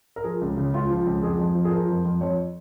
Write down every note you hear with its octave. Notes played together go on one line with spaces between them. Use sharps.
A#4
F3 G#4
C#2
C#3
C#2 F4
F3
C#2
F2 G#4
F2
F3
G#4
F3 A#4
F2
F2
F2 C#5